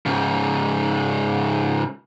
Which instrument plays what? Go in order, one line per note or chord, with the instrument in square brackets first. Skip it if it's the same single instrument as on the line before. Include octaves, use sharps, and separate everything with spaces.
[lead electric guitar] G#2 C#3